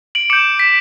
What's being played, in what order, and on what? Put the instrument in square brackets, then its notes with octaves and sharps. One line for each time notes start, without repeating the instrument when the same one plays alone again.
[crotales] D7 F#7
D6 G6 C#7 E7
B6 D7